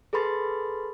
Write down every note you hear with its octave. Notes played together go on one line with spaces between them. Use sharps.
G#4 A4 B4 B5 C6 A6